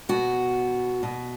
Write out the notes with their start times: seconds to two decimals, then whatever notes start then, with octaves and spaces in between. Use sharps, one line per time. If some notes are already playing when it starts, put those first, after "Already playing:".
0.09 B2 F#4
1.03 B2